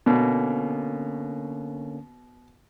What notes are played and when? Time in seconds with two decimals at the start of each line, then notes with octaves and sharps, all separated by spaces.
0.06 B2 D3 A#3 C#4